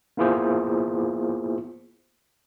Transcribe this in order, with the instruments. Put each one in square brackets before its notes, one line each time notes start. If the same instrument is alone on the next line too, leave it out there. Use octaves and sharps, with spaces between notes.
[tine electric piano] A#3 B3 E4 F4 G#4 C5